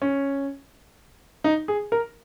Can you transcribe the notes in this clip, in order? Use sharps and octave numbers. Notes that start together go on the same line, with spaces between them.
C#4
D#4
G#4
A#4